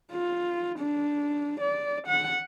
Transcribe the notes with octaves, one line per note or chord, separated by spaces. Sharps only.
F4
D4
D5
F#5